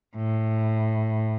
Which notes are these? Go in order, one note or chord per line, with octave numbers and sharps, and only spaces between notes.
A2